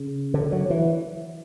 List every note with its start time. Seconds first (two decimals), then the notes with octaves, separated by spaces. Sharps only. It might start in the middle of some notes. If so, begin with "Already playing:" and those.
Already playing: C#3
0.34 D3
0.52 F#3
0.70 E3